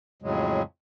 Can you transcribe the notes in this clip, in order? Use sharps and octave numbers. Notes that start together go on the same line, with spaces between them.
F2 A2 C#3 F#3 G#3